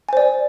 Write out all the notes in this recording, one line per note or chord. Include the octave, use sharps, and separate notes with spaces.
C5 D5 G#5